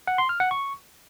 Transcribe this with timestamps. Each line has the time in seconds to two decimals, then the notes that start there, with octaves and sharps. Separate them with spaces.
0.07 F#5
0.18 C6
0.29 F6
0.40 F#5
0.51 C#6